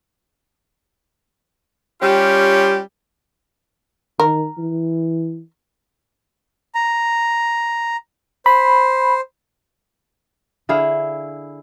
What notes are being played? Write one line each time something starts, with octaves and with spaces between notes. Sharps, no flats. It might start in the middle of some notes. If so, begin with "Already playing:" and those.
G3 C#4 F4 G4
D#3 A#4
E3
A#5
C5 B5
D3 E4 G#4 F5